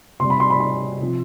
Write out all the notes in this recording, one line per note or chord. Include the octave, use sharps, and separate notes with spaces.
C3 G3 C6
B5
C6
B5
C6
C3 F3